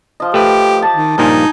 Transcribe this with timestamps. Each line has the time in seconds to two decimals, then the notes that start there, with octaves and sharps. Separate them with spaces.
0.20 F3 D#5
0.34 A3 G4 B4
0.82 G4 A5
0.95 D#3
1.18 G2 A#2 F3 D#4 G#5 A5